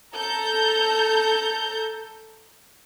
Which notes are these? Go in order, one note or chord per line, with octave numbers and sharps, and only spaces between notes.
A4 A#5 G6